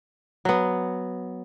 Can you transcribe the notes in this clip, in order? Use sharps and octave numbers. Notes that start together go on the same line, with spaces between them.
F#3 B3